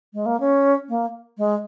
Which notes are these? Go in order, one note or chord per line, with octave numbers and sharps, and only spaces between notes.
G#3
A#3
C#4
A#3
G#3